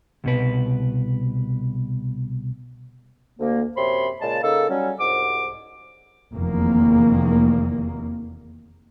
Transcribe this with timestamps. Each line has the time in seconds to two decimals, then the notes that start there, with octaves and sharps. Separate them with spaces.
0.24 C2 B2 B4
3.39 D2 A#3
3.76 F#2 C3 C5 C#5 B5 C6
4.21 A#2 C#3 G#3 A5
4.43 C#3 A#3 D#4 A4
4.69 F#3 G3 C#4
5.00 C2 G#2 F#4 D6
6.32 F1 E2 D#3 A#3